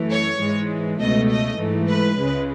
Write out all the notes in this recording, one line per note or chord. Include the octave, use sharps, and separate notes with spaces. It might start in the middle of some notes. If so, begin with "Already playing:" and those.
Already playing: F#2 E3 A3
C#5
G#2 E3 G#3
C#2 B2 A3 D#5
D#5
G#2 E3 A3
B4
C#2 C#3 G#3